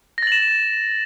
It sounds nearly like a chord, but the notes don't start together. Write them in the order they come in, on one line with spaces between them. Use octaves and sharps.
A#6 A6 F#7 E7